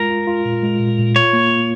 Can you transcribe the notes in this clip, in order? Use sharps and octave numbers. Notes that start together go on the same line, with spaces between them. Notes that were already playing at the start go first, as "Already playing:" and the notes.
Already playing: G#3 F4 A#4
F4
F4
A#2
G#3
A#2
A#2
F4 C#5
A#3
A#3